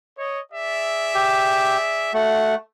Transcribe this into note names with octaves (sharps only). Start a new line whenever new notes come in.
C#5 D#5
G#4 D5 E5
G4
A3 F#4 F#5